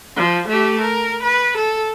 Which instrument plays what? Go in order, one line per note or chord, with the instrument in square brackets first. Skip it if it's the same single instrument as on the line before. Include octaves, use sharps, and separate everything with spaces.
[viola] F3
A3 G4
A#4
B4
A4